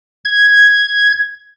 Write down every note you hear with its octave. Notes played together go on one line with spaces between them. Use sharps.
G#6